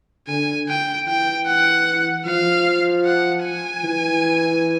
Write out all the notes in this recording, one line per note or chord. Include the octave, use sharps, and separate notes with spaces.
D3 G#5
G5
E3 G5
F#5
F3 F5
F#5
G#5
E3